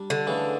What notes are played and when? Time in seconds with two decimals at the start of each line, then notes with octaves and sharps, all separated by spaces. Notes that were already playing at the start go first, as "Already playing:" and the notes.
Already playing: G3 D4
0.10 D3
0.27 C#3 E3 A3